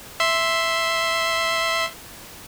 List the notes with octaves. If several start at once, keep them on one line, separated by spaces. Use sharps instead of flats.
E5 C6